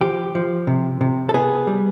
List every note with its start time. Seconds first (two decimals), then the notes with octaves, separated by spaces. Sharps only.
0.01 F3 G4
0.35 F3
0.67 C3
1.01 C3
1.29 A4
1.34 B3 G#4
1.67 G3